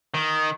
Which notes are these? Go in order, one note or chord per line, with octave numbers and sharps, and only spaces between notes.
D#3